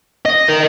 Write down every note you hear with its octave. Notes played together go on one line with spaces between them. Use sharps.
D#5
A#4